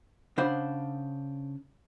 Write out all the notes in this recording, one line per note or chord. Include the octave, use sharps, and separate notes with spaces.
C#3 D4 C5 F#5 B5